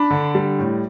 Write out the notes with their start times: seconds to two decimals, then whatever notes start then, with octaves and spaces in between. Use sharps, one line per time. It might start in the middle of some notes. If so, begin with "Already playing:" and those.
Already playing: D4 B5
0.11 D3
0.35 G3
0.59 A2